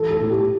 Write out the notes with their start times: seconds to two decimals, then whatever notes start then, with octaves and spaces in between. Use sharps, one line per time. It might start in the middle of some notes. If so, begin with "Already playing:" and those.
Already playing: E3 A4
0.11 A4
0.20 A2
0.30 G4